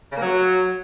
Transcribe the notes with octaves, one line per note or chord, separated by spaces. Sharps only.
C#3
A#3
F#3